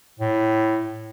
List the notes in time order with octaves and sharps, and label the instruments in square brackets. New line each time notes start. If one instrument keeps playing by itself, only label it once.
[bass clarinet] A2